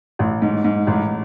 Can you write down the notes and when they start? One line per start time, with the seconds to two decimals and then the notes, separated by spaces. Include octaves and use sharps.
0.19 A1
0.42 G#2
0.64 G#2
0.87 A1